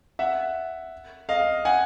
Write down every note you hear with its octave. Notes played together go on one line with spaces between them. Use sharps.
E5 F#5
D#5 F5
F#5 G#5